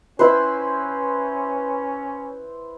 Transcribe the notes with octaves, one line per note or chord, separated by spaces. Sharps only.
C#4 E4 B4 C5